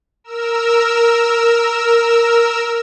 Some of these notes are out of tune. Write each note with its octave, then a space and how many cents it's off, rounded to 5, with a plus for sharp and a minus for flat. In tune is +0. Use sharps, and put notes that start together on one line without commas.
A#4 +0 E6 +0